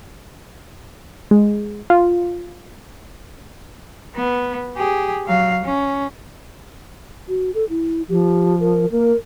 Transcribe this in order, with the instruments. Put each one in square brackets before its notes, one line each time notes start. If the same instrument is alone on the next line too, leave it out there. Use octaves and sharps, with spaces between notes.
[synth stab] G#3
F4
[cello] B3
G4 G#4
F#3 F5
C#4
[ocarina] F#4
A4
E4
[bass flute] F3 [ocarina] G4
[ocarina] A#4
[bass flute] A#3 [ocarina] A#4